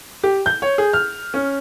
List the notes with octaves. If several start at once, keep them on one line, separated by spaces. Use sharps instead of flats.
G4
G6
C#5
G#4
F6
C#4